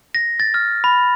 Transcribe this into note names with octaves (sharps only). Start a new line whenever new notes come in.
A#6
A6
F6
B5